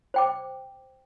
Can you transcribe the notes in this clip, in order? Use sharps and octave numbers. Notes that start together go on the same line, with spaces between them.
C5 G5 D6